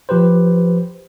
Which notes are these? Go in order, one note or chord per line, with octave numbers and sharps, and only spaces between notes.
F3 G4 B4 C5